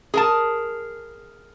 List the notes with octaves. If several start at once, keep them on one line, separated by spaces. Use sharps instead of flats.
G#4 A#4 A5